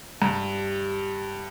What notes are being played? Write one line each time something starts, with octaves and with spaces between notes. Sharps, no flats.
G2